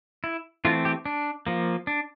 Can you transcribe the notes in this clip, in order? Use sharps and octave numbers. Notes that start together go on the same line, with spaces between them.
E4
E3 A3 C4 F4
G4
D4
F3 A#3
D4